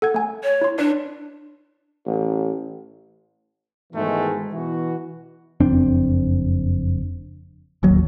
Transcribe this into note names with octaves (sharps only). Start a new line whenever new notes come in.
A4 F#5 G#6
A3 G#5
C#5
E4 C6
D4 B4 D5
A1
G#2 B2 D#3 E3 G#3 A3
B2 E3 F#4
F#1 F2 C4 D4
D1 G#1 D#2 F#3